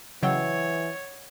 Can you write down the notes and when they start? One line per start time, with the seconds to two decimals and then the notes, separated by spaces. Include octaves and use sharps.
0.23 C#3 E3 F#3 C#5 D#5 F#5 G5 E6